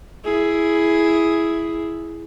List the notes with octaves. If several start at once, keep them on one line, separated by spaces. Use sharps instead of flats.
E4 G#4